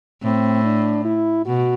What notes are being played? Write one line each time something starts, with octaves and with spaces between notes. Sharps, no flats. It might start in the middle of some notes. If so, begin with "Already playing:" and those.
A2 C4
D4
E4
B2 F#4